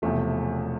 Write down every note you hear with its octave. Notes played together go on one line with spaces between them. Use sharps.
E1 E2 C3 F3 A3